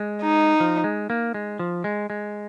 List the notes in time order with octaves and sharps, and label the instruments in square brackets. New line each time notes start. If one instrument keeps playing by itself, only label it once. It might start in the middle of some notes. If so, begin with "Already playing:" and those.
Already playing: [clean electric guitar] G#3
[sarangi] D#4
[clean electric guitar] F3
G#3
A#3
G#3
F3
G#3
G#3